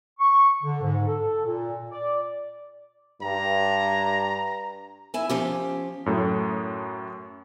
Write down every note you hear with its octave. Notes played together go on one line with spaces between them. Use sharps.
C#6
D3
G#2
A4
A#2
D5
G2 A#5
E4 G#5
F3 C#4 G4
F#2 A2 A3